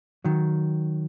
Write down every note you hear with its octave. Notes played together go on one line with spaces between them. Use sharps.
D#3 F#3